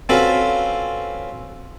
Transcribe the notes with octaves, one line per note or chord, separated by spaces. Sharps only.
C4 C#4 F4 F#4 A4 B4